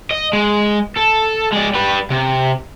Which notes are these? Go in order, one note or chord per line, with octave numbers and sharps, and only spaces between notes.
D#5
G#3
A4
G#3 D5
G3 B4
C3